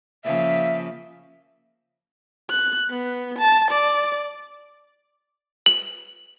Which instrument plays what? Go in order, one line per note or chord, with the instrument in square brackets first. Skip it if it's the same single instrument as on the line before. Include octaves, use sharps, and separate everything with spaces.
[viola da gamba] C#3 F3 A#3 [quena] E5
[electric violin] F#6
B3
A5
D5
[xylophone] F#7